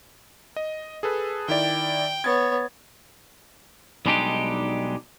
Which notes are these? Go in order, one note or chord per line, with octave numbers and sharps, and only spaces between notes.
D#5
G#4 A4 B4
D#3 E4 D5 G5
B3 C#5 G#6 A6
B1 G3 G#3 D4 D#4 G4